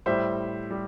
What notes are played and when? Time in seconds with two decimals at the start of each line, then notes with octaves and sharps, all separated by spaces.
0.06 A2 G3 C5 E5
0.71 G3